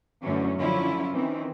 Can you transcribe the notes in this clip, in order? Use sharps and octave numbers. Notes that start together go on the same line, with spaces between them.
F#2 D3 E3 F#3 A3 C#4
D3 F3 F#3 C#4 E4 F4
D#3 E3 C4 C#4